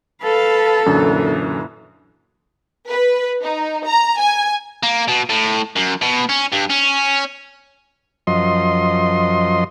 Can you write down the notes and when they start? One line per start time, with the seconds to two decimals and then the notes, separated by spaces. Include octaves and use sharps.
0.23 A4 B4 F5 A5
0.86 F#2 A#2 D3 E3
2.89 B4
3.41 D#4
3.85 A#5
4.20 G#5
4.83 A#3
5.08 B2
5.29 A2
5.76 F#2
6.01 B2
6.29 C#4
6.52 G2
6.70 C#4
8.27 F#2 F3 D#5 C6